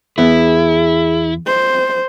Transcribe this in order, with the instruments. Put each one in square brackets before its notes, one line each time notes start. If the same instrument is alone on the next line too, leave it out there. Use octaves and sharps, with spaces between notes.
[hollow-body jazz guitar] E2 B3 [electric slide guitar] E4 [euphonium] G#4
[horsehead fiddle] C5